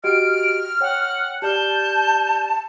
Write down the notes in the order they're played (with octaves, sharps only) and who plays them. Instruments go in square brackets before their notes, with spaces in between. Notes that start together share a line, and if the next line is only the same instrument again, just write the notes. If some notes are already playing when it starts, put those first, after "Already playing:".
[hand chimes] F#4 G4 D#5 [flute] F6 [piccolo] D7
[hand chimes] C#5 G5 [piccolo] F#5
[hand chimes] G4 D5 F6 [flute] A5 [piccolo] G6